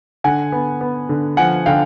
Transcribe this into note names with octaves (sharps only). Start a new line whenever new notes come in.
D3 F#5 G#5
B3
B3
D3
F3 F#5 G#5
D3 F5 G5